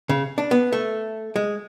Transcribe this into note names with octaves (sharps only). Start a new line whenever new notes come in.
C#3
D4
B3
A3
G#3